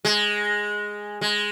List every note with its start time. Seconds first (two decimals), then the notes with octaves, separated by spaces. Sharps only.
0.05 G#3
1.21 G#3